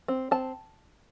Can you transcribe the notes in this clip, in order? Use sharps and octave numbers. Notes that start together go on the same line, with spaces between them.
C4
C4 A5